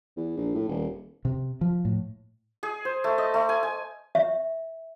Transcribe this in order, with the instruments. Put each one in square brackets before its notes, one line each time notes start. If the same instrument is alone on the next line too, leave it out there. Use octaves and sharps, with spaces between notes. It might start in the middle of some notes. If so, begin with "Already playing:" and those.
[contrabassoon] E2
A#1
A2
D#1
[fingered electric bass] C3
F3
A2
[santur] G#4
C5
A3
D#5
A3
G#5
G#5
[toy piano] E5